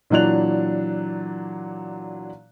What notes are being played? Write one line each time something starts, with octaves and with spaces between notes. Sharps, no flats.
A#2 E3 F#3 D4 F#6 F7